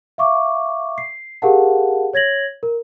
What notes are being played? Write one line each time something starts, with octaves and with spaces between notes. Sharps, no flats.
E5 F5 C#6 D6
C7
G4 G#4 A#4 F5 F#5 A5
C#5 G#6 A#6 F#7
A#4